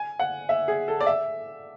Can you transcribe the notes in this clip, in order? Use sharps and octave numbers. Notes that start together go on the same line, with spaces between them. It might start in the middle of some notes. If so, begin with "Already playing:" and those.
Already playing: G#5
F#5
E5
G#4
A4
D5
E5